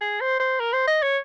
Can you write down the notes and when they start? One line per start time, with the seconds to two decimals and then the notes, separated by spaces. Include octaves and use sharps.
0.01 G#4
0.21 C5
0.40 C5
0.60 A#4
0.73 C5
0.87 D#5
1.02 C#5